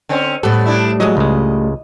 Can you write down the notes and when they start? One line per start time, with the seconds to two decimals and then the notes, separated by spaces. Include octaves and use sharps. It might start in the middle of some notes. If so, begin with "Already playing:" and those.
0.09 D3 C4 C#4
0.43 A2 G3 B3 A4
0.66 D4 E4
1.00 F#3 G#3 D#5
1.17 C#2 G#3